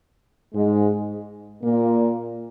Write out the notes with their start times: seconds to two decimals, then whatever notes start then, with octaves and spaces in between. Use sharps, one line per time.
0.54 G#2 G#3
1.63 A#2 A#3